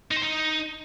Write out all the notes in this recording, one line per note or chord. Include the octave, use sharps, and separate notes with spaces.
D#4
C5
D#4